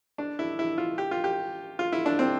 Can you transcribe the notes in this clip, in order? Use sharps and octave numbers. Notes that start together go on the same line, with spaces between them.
D4
E4
E4
F4
G4
F4
G4
F4
E4
D4
C4